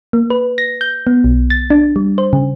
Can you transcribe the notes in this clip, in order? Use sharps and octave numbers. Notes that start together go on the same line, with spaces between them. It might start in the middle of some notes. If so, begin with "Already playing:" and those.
A#3
B4
A#6
G6
B3
B1
A6
D4
G3
C5
C#3